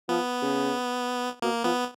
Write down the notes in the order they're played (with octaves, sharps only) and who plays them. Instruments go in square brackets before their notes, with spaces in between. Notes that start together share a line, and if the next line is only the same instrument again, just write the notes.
[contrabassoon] F3 [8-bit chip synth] B3
[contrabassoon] C#3
[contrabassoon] B2 [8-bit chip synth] A#3
[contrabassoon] F3 [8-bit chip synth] B3